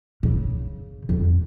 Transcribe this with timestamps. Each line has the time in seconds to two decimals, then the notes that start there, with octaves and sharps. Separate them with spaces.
0.23 C#3
1.09 F2